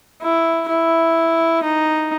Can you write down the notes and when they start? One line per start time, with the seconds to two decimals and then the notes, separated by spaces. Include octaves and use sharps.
0.22 E4
0.68 E4
1.63 D#4